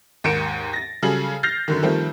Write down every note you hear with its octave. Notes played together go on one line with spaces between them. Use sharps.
D#2 G#2 A#4 C#7 D7 E7
A6 A#6
C#3 F#3 G3 G#4 A4 F#7
F6 G6 A6 A#6 C7 F7
F#2 D3 D#3
D#3 F3 G3 A3 C4